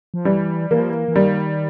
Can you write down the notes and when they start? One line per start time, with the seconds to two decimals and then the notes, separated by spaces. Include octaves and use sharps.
0.14 F3
0.25 E3 G3
0.71 E3 A#3
0.80 F3
0.90 E3
1.08 E3
1.16 D#3 G3